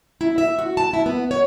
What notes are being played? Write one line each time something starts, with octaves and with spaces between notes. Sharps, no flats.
E4
E5
F#4
A5
E4
B3
C#5